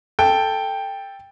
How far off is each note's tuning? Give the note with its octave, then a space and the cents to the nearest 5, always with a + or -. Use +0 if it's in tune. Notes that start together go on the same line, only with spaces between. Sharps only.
A4 +0 G5 +10